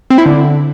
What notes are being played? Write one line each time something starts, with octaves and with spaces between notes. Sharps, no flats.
C4
E4
D3